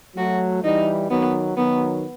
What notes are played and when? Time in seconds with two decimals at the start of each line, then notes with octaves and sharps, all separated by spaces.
0.17 F#3 A3 F#4
0.64 E3 G3 D#4
1.10 D#3 F#3 B3
1.57 D#3 F#3 B3